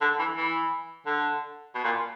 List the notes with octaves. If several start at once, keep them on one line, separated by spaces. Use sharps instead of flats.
D3
E3
E3
D3
B2
A#2